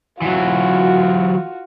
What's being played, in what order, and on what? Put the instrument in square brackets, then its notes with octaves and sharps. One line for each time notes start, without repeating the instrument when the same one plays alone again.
[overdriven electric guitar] E3 F#3 [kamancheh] F4 F#4